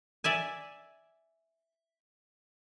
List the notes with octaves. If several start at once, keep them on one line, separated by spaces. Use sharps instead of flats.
D5 E5 G#5